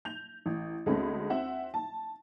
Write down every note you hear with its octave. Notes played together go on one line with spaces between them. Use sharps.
G6 F7
A1
D2 G#3 A3 C4 C#4 B5
C4 E5 F#5
A5